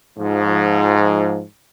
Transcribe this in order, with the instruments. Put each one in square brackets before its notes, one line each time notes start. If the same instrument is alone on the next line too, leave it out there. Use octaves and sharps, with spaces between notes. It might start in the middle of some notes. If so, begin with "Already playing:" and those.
[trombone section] G#2 F3